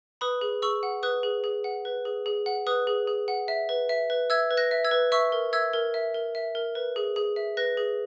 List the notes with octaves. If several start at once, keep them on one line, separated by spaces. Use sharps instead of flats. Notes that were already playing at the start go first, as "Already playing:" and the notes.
B4 B5 D#6
G#4
G#4 C#6 E6
F#5
B4 D#6 F#6
G#4
G#4
F#5
B4
G#4
G#4
F#5
B4 D#6 F#6
G#4
G#4
F#5
E5
B4
E5
B4
E5 E6 G#6
B4
F#6 A#6
E5
E6 G#6
B4
E5 C#6 E6
A#4
E5 E6 G#6
A#4
E5
A#4
E5
A#4
B4
G#4
G#4
E5
B4 F#6 A#6
G#4